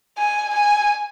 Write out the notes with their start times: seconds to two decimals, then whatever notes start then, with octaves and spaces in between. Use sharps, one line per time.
0.17 G#5
0.54 G#5